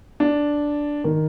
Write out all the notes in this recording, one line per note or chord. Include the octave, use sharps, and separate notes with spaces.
D4
D#3